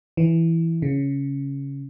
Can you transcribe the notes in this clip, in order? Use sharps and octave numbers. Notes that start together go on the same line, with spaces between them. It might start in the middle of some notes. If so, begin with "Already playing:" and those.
E3
C#3